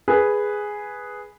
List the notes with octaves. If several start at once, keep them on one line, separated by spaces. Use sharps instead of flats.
G#4 B4